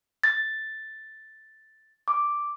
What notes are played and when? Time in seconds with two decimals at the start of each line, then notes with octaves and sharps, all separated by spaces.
0.24 A6
2.08 D6